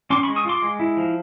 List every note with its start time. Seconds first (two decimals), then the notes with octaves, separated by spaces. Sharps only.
0.10 C#4 C6 D6
0.23 B5 C#6
0.28 G#3
0.36 C#6 D#6
0.45 F4 C6 D6
0.62 G#3
0.80 E4
0.97 F3